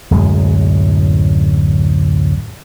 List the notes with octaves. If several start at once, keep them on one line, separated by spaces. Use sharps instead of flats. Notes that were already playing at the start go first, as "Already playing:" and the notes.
D1 F#2 G#3